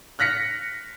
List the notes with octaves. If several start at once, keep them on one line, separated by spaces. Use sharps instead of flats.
F6 F#6 A#6 B6 C#7